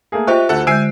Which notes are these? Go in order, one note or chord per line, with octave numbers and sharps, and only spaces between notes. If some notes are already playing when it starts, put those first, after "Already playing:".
A3 A#3 G#4
F4 G4 C5 D#5 E5 G5 C#6 F#6
D2 A3 A4 F#5
D3 G#3 G#5 E6 G6 C7 D7